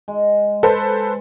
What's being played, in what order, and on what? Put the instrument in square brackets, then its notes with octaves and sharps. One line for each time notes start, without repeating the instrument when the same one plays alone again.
[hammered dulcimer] G#3
[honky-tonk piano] A4 B4 C5